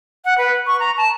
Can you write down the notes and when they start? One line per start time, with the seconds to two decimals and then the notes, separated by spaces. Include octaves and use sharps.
0.25 F#5
0.38 B4
0.67 C#6
0.80 A#5
0.97 A5